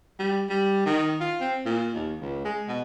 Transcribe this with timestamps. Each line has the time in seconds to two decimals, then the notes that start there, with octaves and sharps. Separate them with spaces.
0.19 G3
0.49 G3
0.86 D#3
1.21 F4
1.40 C4
1.66 A#2
1.95 D#2
2.21 C#2
2.45 G#3
2.68 B2